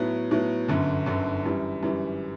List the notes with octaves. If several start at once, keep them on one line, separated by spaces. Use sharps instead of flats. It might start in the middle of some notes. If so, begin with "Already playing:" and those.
Already playing: A2 F#3 B3
A2 F#3 B3
G1 F#2 D3
G1 F#2 D3
F#2 E3 G3
F#2 E3 G3